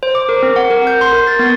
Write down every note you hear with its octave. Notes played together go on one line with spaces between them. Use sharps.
C5
D6
A#4
C4
F#5
A#4
G6
C6
A#4
A6
B3